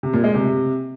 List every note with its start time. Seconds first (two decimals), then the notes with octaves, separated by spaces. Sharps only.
0.03 C3
0.13 A#2
0.24 G#3
0.34 C3